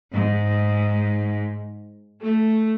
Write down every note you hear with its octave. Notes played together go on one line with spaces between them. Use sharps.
G#2
A3